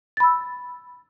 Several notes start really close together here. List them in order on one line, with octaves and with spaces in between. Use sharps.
A6 B5 E6